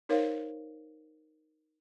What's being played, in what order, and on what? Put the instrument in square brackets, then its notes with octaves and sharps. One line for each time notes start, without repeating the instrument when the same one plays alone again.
[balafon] D#4 A#4 C5 C#5 F5